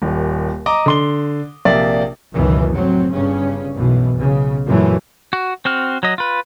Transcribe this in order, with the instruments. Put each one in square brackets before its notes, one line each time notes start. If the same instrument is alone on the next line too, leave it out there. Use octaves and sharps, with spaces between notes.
[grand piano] D#1 D#2
D#5 A#5 D6 D#6
D3 C6 G7
A#1 C3 A#3 D5 E5
[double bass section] C#2 F#2 B2 D#3 E3
F1 A2 F#3 C4
G1 G2 C#3 C#4
B1 F#2 B2 E3
B1 C#3
F#2 A#2 E3 F#3 A3
[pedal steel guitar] F#4
C4 F#4 F6
F#3 D#5
F4 B4